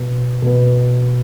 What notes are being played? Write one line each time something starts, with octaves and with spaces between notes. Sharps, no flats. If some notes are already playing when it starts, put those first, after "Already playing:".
Already playing: B2 B3
B2 B3